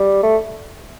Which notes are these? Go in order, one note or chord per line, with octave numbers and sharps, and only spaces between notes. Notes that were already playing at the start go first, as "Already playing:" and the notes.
Already playing: G3
A3